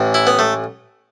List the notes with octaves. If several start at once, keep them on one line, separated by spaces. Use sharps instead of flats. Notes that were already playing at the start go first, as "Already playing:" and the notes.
Already playing: A1 A2 E3
E4
B3
A3